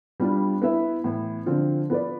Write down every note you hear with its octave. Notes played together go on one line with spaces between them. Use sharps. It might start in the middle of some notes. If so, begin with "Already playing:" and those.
G3 B3 D4 F4
B3 E4 B4 E5
A2 E3 B3
D3 F3 C4 F4
B3 F4 B4 D5